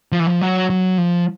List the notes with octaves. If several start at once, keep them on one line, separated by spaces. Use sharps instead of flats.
F3
E3
F3
F#3
F#3
F3